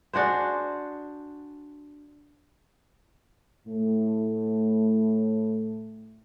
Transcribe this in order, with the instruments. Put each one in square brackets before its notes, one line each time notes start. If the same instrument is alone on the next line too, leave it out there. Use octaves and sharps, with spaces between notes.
[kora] D4 F#4 G#4 C5
[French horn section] A2 A3